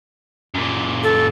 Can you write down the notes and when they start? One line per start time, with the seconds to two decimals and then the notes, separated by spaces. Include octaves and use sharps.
0.54 F#2 A#2
1.04 A4